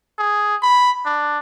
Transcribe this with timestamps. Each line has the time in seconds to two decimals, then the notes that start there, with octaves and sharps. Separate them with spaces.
0.18 G#4
0.62 B5
1.06 D4